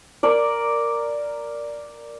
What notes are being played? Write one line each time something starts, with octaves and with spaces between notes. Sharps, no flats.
A#4 D5